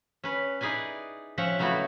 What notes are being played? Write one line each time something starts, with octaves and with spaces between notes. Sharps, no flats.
C#4 B4
D#4 E4 G#4 B4 D5 G#5
F3 C4 C#4 E5 F#5
C#3 F#3 A3 B3 E4 F#4